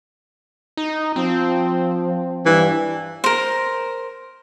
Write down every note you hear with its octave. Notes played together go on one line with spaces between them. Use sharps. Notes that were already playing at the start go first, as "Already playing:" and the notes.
D#4
F3 C4
G2 E3
A#4 C5